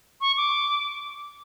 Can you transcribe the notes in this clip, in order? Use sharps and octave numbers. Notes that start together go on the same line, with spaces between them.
C#6
D6